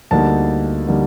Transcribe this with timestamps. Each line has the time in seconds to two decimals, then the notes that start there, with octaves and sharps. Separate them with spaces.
0.11 D2 D3 G3 A#3 D#4 A5
0.87 D3 G3 A#3 D#4